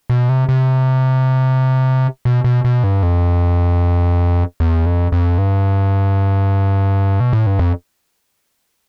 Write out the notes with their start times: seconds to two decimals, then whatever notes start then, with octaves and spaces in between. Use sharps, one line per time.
0.10 B2
0.29 C3
0.49 C3
2.25 B2
2.44 B2
2.65 B2
2.84 G2
3.03 F2
4.60 E2
4.86 F2
5.12 F2
5.38 G2
7.20 B2
7.33 A2
7.47 G2
7.59 F2